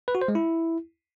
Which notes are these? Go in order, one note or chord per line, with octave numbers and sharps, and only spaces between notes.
B4
F#4
C5
G#3
E4